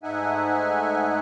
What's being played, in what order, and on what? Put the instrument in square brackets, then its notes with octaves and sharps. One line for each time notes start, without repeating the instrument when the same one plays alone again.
[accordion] G#2 A3 D#4 E5 F#5 G#5